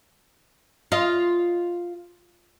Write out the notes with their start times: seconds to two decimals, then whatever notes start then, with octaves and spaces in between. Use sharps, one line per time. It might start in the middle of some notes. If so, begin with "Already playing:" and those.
0.92 F4 D#5